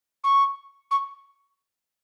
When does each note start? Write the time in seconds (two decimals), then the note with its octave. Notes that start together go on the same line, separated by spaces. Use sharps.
0.23 C#6
0.91 C#6